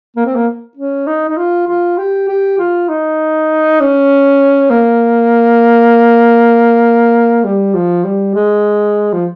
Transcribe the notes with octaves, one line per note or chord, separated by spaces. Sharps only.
A#3
C4
A#3
C#4
D#4
D#4
F4
F4
G4
G4
F4
D#4
C#4
A#3
G3
F3
G3
G#3
F3